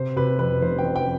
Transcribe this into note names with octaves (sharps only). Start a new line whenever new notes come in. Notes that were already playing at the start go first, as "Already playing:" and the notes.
Already playing: C3 C5
C3 B4
F2 B4
F1 C5
G5
F2
G5